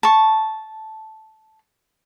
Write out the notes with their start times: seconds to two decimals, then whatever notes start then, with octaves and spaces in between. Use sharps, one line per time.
0.03 A5 C#6